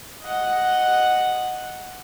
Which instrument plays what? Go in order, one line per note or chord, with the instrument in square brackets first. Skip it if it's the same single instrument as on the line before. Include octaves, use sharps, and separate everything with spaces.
[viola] D#5 F#5